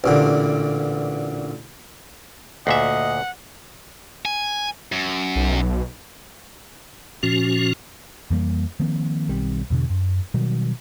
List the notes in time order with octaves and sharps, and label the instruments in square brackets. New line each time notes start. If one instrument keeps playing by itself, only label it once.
[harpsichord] A1 A#2 D3
[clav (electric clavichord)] D2 A#2 E5 [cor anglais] D#5 [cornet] F#5
[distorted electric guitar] G#5
F#2
[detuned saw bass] B1
[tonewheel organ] A#2 F3 C#4 F#4
[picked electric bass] F2 E3 G3 A#3
D#3 F3 A#3 C4
B1 D#3 G3 C4
E2 B2 D3
F#2
B2 D#3 F#3 G3